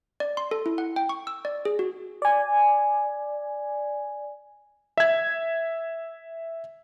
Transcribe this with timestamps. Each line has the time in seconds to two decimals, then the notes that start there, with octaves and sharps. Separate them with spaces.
0.20 D5
0.37 C6
0.51 A4
0.66 E4
0.78 F#5
0.96 G5
1.09 C#6
1.27 E6
1.45 D5
1.65 G#4
1.79 F#4
2.22 D5 G#5
4.97 E5 G#6